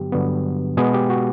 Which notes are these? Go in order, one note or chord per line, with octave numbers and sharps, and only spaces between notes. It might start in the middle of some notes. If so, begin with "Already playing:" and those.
Already playing: G2 D3 F#3 B3 G4
G2 D3 F#3 B3
B2 G#3 B3 G#4
G4
F#4